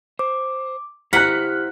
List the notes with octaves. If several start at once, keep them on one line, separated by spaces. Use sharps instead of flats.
C5 D6
E4 G4 C5 F#5 A#5 F6 F#6 B6